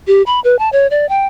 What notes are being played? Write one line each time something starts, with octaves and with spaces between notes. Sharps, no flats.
G4
B5
B4
A5
C#5
D5
G5